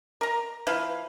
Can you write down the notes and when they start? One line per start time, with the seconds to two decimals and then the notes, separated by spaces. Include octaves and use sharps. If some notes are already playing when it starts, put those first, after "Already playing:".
0.21 A#4 A#5
0.67 F3 E4 B4 F5